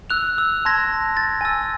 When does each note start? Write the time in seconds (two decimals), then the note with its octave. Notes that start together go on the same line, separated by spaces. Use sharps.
0.10 E6 F#6 F7
0.38 E6
0.65 A5 C6 G#6 A#6
1.17 A6
1.41 G#5 E6